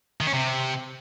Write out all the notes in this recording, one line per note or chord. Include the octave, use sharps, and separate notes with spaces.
D#3
C#4
C3